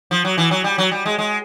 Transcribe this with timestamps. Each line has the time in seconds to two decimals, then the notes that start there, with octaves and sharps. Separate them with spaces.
0.11 F3
0.25 F#3
0.38 E3
0.51 F#3
0.64 G3
0.78 F#3
0.91 G3
1.06 G#3
1.18 G#3